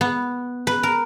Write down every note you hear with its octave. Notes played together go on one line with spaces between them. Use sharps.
B3
B4
A#4